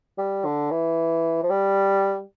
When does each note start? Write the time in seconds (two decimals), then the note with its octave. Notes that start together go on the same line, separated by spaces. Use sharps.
0.18 G3
0.45 D3
0.71 E3
1.43 F3
1.50 G3